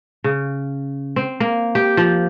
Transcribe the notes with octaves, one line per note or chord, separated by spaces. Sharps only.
C#3
C4
A#3
G4
F3